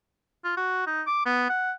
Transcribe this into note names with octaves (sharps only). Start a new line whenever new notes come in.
F4
F#4
D#4
D6
B3
F#5